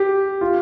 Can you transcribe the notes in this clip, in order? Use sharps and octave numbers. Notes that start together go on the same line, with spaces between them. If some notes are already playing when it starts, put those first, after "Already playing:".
Already playing: G4
F4